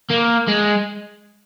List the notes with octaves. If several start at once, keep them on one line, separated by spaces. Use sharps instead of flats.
A#3
G#3